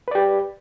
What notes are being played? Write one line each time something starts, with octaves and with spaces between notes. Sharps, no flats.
G4 B4 D5